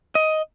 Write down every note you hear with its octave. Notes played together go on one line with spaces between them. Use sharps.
D#5